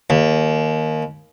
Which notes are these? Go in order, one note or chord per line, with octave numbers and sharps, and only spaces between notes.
D#2